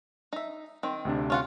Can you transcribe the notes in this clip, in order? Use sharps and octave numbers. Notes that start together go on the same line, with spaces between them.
D#4 E5
D#3 C4
D2 C3 D4
C#4 F4 F#5